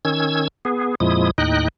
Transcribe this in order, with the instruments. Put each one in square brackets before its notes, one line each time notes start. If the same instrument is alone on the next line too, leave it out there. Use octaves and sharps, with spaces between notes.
[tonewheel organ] D#3 C#4 E6 G#6
B3 G#4
F2 A#2 F3 G#3 E4 D#6
D#2 A2 D#4 D#5 G5 F#6